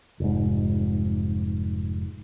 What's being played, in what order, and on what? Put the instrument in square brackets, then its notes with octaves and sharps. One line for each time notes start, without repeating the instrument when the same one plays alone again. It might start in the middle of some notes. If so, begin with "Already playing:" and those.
[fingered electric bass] F1 G#2